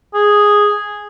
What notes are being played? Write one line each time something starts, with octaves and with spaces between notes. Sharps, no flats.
G#4